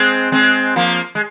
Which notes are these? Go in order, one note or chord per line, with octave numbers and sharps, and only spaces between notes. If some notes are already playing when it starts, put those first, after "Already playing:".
Already playing: G#3 C4
G#3 C4
F3 A#3
G#3